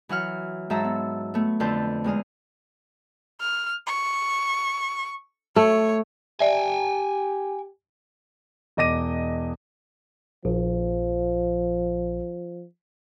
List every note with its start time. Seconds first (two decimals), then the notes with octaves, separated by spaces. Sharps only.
0.09 E3 F#3 F#5 F6
0.70 G#2 F#3 E5 A5 A#5 E6
0.84 B3
1.34 A3 B3
1.60 F2 D3 B4 C5 A5 G6
2.04 E2 G#3 D#6 F6
3.41 F6
3.87 C#6
5.56 A3 C#5
6.40 G4 D5 E5 G5 G#5
8.77 E1 D#5 D6 A#6 D#7
10.45 A#1 F3